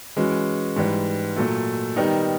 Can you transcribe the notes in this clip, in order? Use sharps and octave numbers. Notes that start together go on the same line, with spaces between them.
E3 G#3 C#4 F#4
G#2 E3 G3
A#2 F#3 A3
D#3 G3 B3 D#4